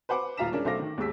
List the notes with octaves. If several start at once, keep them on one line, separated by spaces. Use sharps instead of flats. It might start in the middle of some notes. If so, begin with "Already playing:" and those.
B4 C5 F#5 D6
D#1 F4 F5 A#5 B6 E7
G#3 C#4 D4 A#4
B1 A3 C5 F5 D6 A#6
D#3
D#2 G#2 G#3 E6 B6